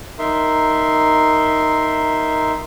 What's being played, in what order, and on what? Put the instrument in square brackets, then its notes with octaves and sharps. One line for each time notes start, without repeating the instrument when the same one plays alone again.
[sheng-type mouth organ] D#4 A#4 E5 C6